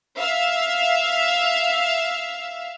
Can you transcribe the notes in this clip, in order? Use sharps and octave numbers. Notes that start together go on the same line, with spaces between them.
E5 F5